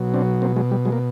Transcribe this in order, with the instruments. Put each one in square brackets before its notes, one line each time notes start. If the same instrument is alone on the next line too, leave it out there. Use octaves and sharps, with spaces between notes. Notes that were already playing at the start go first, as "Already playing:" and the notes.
Already playing: [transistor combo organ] B2 F#3
C4 D4
A#3 C4
F#3 G#3
G3
F#3 G#3
A#3